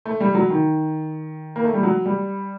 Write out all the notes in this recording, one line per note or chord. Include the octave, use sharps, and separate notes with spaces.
A3
G3
F#3
D#3
A#3
A3
G3
F#3
G3